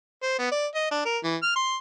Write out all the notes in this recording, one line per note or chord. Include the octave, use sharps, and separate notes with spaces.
C5
B3
D5
D#5
D4
A#4
E3
F6
C6